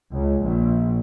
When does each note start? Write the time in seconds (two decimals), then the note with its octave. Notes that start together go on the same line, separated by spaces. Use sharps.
0.11 C#2
0.42 A#1